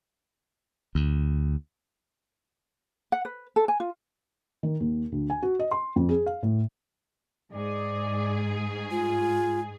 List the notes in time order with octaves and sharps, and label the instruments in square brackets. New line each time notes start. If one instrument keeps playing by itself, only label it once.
[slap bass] D2
[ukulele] F#5
B4
A4
G#5
F4
[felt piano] D#3
D#2
D2
G#5
F#4
D#5
C6
F2
G#4
F5
A2
[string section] G#2 G#4 [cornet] D5
[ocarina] F4 [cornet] G#5